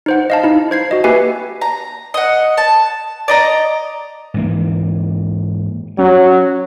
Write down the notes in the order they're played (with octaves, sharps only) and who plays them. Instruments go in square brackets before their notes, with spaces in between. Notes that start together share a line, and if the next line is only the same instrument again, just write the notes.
[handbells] D#4 C5 F#5
D#5 F5 A5
D#4 E4
C5 G#6 C7
F#4 D#5
A#3 G4 B4 E5 G#5 C7
[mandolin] A#5
D#5 F#5
A5
D5 D#5 A#5
[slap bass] G#2 E3 A#3
[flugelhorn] F#3 [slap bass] C#4